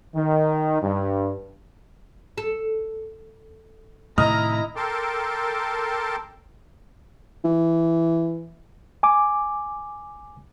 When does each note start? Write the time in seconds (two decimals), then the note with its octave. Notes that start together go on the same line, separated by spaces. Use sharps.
0.15 D#3
0.81 G2
2.38 A4
4.18 A2 C3 D#3 E4 D#5 A#5 D#6 F6
4.76 A4 A#4 G5 A5 C6 D6
7.44 E3
9.03 G#5 D6